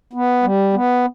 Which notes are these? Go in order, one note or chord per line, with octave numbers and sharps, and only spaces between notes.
B3
G3
B3